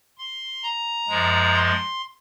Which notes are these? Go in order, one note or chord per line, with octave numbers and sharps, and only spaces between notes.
C6
A#5
F#2 F3 G#3
C6